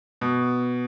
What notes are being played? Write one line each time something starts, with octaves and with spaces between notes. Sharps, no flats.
B2